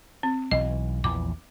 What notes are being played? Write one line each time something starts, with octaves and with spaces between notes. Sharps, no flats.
C4
B1 E3 D#5
A#1 E2 E3 D6